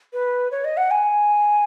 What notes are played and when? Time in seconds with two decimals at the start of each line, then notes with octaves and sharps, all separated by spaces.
0.13 B4
0.52 C#5
0.65 D#5
0.77 F#5
0.91 G#5